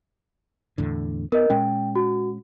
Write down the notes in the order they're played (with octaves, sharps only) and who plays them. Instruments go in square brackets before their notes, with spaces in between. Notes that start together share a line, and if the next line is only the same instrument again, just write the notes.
[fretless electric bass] E2 A2 D3
[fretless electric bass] B3 [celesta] A#4 D#5
[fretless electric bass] A#2 G#3 C#4 [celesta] G5
[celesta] F#4